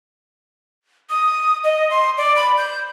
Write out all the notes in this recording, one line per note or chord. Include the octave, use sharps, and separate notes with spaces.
D#6
D#5
C6
D5
B5
G6